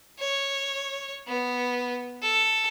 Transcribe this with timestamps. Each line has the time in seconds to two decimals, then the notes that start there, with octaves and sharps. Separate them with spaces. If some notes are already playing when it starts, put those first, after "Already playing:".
0.19 C#5
1.28 B3
2.22 A4